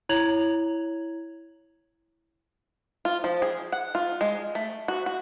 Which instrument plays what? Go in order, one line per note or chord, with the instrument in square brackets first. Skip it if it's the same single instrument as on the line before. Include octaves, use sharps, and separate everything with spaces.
[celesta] E4 C#5 A#5 G#6 F7 F#7
[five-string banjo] F4
F3
G#4
F#5
F4
G#3
A3
F#4
F#4